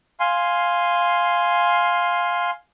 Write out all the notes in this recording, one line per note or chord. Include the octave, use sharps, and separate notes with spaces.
F5 G#5 C6